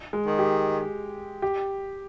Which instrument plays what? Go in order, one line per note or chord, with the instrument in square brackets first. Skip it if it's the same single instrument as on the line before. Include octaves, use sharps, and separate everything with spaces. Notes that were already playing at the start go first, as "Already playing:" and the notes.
[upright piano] G#3
[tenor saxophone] D#3
[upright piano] G4
G4